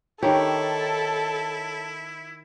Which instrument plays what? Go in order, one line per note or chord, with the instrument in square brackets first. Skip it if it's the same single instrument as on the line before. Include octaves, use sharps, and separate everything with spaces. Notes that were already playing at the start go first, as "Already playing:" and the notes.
[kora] D#3 G4 [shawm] E4 [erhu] A4 [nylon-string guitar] C#5